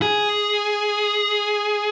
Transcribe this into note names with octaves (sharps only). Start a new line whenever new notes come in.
G#4